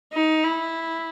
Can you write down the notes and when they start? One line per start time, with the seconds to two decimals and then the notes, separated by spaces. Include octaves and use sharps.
0.13 D#4
0.43 E4